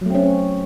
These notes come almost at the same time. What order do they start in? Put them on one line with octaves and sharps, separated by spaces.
F#3 A3 C4 C#4